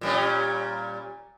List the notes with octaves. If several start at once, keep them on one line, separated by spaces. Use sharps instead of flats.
A#2 G3 C#4